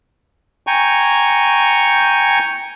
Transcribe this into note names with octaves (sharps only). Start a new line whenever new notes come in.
G5 G#5 A#5 C#6